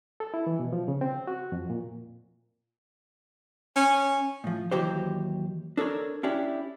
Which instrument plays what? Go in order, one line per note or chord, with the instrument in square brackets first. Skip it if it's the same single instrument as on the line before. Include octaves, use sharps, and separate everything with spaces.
[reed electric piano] A4
E4
E3
B2
F3
C#3
C4
F#4
F2
A#2
[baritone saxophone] C#4
[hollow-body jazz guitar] A2 F3
D#2 E3 F#3 G4 C5
D4 A4 A#4 C#5
C#4 D4 E4 G4